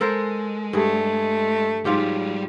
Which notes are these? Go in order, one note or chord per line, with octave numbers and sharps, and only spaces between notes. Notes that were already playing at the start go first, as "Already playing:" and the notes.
G#3 A4 A#4 C5
G2 A3 G#4
G#2 F#3 G3 F4 G4